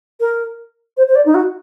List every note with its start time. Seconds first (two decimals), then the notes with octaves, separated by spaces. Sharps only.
0.20 A#4
0.97 C5
1.08 C5
1.16 D5
1.26 D#4
1.35 F#4